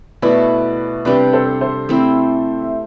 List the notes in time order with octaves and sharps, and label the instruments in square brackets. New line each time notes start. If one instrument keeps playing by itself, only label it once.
[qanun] B2 A3 E4 [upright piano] B4 D5
[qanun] C3 G3 D4 G4 [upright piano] B4 D5
[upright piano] A4 C5
A4 C5
[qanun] A3 C4 E4
[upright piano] E5